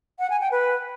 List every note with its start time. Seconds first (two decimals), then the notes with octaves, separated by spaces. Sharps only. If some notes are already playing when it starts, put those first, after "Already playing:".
0.19 F#5
0.30 G#5
0.41 G5
0.51 B4